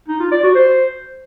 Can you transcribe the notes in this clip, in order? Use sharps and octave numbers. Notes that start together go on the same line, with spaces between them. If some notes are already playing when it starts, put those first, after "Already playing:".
D#4
F4
D5
F#4
C5